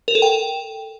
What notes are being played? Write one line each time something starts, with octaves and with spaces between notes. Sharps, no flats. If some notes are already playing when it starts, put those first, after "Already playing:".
A#4
A4
G5